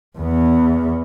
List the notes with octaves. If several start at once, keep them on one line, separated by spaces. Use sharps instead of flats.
E2 B3